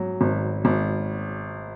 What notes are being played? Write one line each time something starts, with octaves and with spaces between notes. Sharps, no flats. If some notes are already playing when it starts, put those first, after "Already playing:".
Already playing: G#2 F#3
G#1
G#1